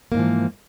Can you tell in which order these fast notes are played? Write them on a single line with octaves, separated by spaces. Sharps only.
A#3 G#2 E3 F3